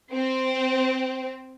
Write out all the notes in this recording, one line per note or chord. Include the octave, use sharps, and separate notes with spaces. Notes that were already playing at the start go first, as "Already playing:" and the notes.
C4